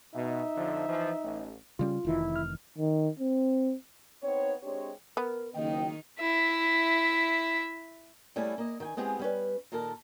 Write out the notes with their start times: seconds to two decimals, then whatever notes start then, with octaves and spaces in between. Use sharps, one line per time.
0.15 B2 D#4 E5
0.56 F2 D3 F3
0.88 E3 F3
1.24 A1
1.79 C#3 G3 C#4 F4
2.05 F1 D#3 E3 E4
2.36 F6
2.78 D#3
3.20 C4
4.22 B3 C4 D#4 C#5
4.62 G#3 C4 D4 G4 C#5
5.17 B3 A#4
5.55 F#1 D#3 A#3 D#4 D#5 G5
6.20 E4 E5
8.36 G3 A3 C#4 E4 G#4
8.58 A#3 D#5
8.80 D#3 G5 G#5
8.97 G#3 B3 C4 E4 G4 G#4
9.19 G3 C#4 B4
9.72 A#2 D#3 A4 A#4 A5